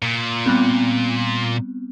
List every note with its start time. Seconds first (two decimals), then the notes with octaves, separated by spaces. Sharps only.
0.02 A#2
0.46 G3 B3 C4